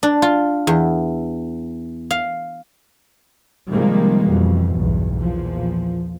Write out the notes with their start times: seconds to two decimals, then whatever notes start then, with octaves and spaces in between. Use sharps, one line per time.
0.03 D4
0.22 F4
0.67 E2
2.11 F5
3.70 C3 D#3 F3 G3 G#3 A#3
4.26 F2 B2 E3
4.77 B1 E2 G2
5.16 E2 A#2 F3